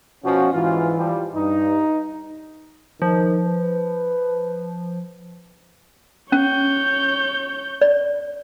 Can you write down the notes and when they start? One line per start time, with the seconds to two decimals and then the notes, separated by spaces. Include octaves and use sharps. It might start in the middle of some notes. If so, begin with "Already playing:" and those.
0.25 B2 F3 C#4 F#4
0.53 G#2 E3 F4
0.97 F3 G3
1.35 G2 D#4
3.02 D#3 F3
3.45 B4
6.32 C#4 C#5 G6
7.82 D5